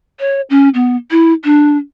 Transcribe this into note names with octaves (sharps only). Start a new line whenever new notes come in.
C#5
C#4
B3
E4
D4